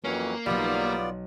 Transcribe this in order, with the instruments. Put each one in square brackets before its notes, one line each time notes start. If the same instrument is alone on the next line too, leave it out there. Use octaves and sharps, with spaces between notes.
[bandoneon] F2 E3 F#3 [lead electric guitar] A#3 [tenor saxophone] C#4
[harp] B1 F#3 [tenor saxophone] G3 [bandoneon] B3 F4 D5